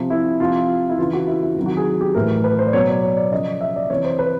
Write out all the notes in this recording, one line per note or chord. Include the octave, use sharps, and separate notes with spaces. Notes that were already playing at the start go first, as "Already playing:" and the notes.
Already playing: C3 F3
E4
C3 F3 F4
E4
C#3 E3 F4
F#4
E4
E4
C3 D#3 F#3
F#4
G#4
G4
A2 E3 A#4
B4
C5
D5
B2 F#3 C#5
D5
C#5
D5
C#3 F3 D#5
E5
D5
C3 E3 C#5
C5
B4